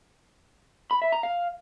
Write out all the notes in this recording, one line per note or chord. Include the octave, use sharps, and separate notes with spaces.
B5
E5
A#5
F5